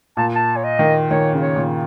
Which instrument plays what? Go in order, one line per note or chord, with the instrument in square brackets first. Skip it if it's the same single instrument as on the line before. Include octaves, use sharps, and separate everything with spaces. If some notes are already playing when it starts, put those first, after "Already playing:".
[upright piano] A#2 [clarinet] A5
[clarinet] A5
C#5
D#5
[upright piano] D#3
[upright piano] D#3 [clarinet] C#5
[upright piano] C#3
[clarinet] C#5
[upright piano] A#2